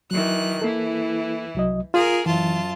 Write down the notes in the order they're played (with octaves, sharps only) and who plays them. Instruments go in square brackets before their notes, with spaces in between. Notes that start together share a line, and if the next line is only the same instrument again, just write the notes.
[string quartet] D#3 E3 F#6 [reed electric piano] F#3
[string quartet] E3 E4 [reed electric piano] A#3 A4
[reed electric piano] C2 F#3 D#5
[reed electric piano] F4 [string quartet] G#4 A#4
[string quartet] F#2 F4 A5 [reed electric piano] E3